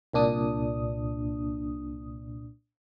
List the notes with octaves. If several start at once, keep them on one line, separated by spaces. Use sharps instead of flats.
C2 A#2 D4 D#6